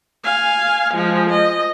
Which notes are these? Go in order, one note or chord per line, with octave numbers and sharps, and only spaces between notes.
F5 G#5
F3 G#3
D#5